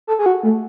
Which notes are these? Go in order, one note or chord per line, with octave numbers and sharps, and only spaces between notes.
A4
G#4
F#4
A3